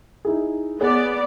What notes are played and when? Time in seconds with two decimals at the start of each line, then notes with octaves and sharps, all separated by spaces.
0.25 D#4 E4 G#4
0.81 B3 G#4 C#5 D5